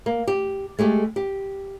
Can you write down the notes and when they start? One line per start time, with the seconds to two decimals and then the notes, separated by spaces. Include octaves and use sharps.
0.06 A#3
0.28 G4
0.79 G#3 A3 G4 A4
1.16 G4